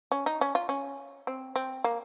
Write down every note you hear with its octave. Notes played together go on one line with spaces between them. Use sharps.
C#4
D#4
C#4
F4
C#4
C4
C4
A#3